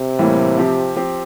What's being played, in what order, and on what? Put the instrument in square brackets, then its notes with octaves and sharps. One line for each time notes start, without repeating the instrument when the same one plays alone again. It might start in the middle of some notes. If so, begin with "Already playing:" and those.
Already playing: [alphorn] C3
[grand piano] A2 E3 G3 A#3
F3 C4 G4
F3 C4 G4